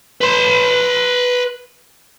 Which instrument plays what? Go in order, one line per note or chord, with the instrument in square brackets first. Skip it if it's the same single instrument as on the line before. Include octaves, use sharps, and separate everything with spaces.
[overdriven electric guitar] B4 C6